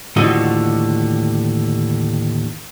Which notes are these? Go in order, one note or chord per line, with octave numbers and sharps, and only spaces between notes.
D#2 A2 D3 F3 F#4 D#5